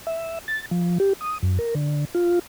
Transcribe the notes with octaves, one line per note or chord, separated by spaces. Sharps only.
E5
A6
F3
G4
D#6
F#2
A#4
D3
F4